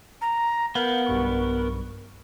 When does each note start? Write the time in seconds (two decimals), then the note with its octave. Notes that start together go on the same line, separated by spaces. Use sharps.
0.21 A#5
0.75 B3 A#4 F5 F6 G6
1.06 B1 G2 C#6